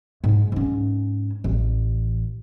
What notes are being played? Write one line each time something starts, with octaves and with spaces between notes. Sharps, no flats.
G#2
G#2 C#4
A1